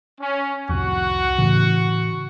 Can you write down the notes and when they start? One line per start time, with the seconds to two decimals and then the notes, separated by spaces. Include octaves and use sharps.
0.21 C#4
0.69 C2 F2 F#4 F#5 C#6
1.38 A2 C#3 E3